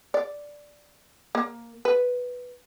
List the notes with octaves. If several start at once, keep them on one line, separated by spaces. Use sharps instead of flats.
D5
A#3
B4